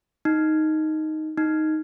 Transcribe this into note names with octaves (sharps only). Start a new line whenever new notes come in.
D#4
D#4